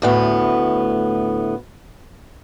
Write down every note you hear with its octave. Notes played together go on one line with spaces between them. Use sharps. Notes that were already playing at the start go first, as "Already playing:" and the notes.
D2 A2 B3